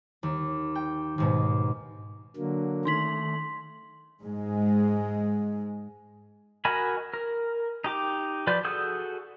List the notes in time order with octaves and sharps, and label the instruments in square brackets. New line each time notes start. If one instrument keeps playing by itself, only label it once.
[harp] D#2
G5
D#2 G#2 B2
[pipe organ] D3 F#3 A#3
[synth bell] D#3 D#4 F#7 [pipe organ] A3 [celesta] C6 B6
[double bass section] G#2 G#3
[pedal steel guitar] F#4 A#4 D#5 G#5 B5
A#4
D#4 G4 D6
F3 B4 D5 G6
F#4 G#4 A4 D#6 G6